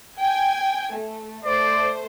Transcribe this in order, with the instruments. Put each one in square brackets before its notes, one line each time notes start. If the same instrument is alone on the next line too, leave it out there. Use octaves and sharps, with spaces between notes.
[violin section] G5 G#5 G#6
A3
[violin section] A3 C5 [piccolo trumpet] D5